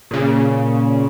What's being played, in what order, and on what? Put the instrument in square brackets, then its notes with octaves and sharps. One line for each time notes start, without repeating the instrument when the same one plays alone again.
[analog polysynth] A#2 C#3